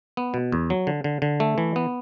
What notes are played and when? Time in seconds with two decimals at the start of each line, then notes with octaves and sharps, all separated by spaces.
0.17 B3
0.34 B2
0.52 E2
0.70 F#3
0.87 D3
1.04 D3
1.22 D3
1.40 A3
1.58 E3
1.76 B3